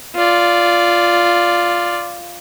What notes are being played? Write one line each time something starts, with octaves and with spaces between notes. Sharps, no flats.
F4 D5